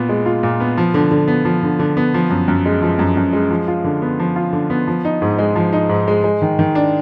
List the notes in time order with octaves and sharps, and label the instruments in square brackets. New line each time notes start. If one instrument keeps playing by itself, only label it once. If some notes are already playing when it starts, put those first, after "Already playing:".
Already playing: [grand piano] A#2 B3
G#3
F4
A#2
B3
F3
D3
D3
B3
F3
D3
D3
B3
F3
F#2
F#2
G#3
F3
F#2
F#2
G#3
F3
F4
D3
B3
F3
F4
D3
B3
F3
D#4
G#2
G#3
F3
D#4
G#2
G#3
G#3
D#3
D#3
D4